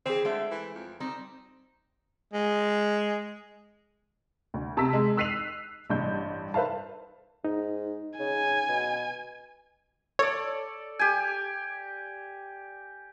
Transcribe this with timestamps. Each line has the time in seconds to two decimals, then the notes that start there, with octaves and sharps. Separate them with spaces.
0.06 E3 C4 G#4 C5
0.25 D3 G#3 A3 E5 D7
0.51 E3
0.75 F2
1.00 G3 C4 D#4
2.34 G#3
4.54 D2
4.77 C3 A5 A#5 E6 B6
4.93 G#3
5.17 E6 F#6 B6 C7 D#7 F7
5.90 A1 G2 G6
6.54 B4 C5 E5 F5 A5
7.45 G#2 D#4
8.19 C#3 G#5
8.69 B2
10.19 A4 C#5 D5
10.99 G4 G#5